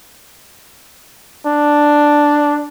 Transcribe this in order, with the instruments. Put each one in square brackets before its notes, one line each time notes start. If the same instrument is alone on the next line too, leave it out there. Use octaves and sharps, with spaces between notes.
[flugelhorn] D4